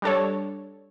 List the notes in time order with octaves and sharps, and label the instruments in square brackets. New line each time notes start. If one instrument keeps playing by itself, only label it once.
[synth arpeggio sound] G3 D4 A4 C#5